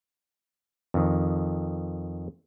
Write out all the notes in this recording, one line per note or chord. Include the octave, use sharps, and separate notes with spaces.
F2 D#3